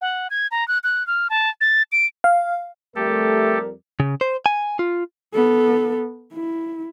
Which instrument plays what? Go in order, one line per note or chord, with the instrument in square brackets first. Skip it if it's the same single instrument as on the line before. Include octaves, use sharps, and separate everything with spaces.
[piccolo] F#5
G#6
A#5
F#6
F#6
F6
A5
A6
D7
[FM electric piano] F5
[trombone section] F2 G3 A#4 [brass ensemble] A3 [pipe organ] G4 A4
[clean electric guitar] C#3
C5
G#5
F4
[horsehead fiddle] B3 A4
E4